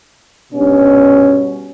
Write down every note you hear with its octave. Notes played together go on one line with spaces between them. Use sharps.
G2 B2 C#4